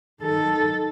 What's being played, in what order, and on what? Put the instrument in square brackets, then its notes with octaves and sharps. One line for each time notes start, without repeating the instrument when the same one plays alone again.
[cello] D#3 A4